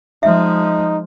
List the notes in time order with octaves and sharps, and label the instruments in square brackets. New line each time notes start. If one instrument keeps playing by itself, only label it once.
[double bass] F3 G#3 [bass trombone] D#4 [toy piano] E5